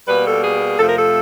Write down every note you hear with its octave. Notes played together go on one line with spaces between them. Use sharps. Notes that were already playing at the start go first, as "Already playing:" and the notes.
B2 G3 A#3 B4
A4
G#4
F2 C3 F3 A3 A4
A#4
A4